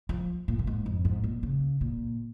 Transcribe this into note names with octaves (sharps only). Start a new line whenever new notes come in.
F3
A#2
A#2
G#2
F2
G#2
A#2
C#3
A#2